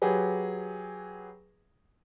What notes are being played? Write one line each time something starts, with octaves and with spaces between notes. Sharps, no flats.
F#3 G4 G#4 B4